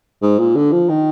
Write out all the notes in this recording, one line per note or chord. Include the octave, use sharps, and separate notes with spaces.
G#2
A#2
D3
F3
D#3